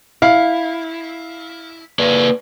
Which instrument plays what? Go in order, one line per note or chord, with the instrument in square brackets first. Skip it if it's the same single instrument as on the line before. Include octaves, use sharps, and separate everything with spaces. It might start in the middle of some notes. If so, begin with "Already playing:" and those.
[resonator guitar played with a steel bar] E4 [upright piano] F5
[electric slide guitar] A#3 B4 D5